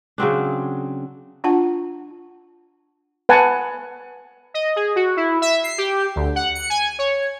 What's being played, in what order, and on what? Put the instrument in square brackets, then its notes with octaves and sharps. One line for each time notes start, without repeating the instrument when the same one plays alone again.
[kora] C#3 F#3 C4 D4
[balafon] D4 F4 F#5 A5
[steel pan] B4 F#5 G#5 A5
[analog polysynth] D#5
G#4
F#4
E4
E5
C7
G4
D2
F#5
C#7
G#5
C#5